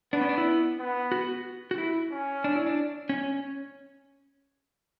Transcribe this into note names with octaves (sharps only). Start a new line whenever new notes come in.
B3 D4
C#4
D4
E4
B3
F#4
F#4
E4
C#4
D4
E4
D4
C#4